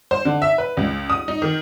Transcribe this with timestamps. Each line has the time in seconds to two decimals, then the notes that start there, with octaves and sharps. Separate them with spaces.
0.11 C5
0.25 D3
0.42 E5
0.58 B4
0.77 C#2
1.10 D#6
1.28 D#4
1.42 D#3